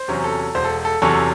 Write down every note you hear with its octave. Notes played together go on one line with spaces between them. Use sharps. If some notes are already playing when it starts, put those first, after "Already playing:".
Already playing: C5
E2 C3 F#3 C#4
A4
E1 C5
A4
A4
E2 C3 F#3 C#4 A4 C#5